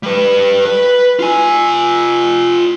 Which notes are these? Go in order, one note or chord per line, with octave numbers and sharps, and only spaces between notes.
G3 B4
B4
F4 G#5